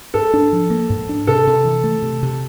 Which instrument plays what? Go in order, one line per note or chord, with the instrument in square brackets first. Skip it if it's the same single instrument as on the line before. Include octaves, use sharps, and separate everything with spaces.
[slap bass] G#2 [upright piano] A4
[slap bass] D4
F3
A#3
G#2
D4
[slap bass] C3 [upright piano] A4
[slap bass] C3
E3
A3
C3
C3